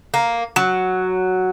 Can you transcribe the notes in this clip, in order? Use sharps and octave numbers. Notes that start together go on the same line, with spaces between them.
A#3
F#3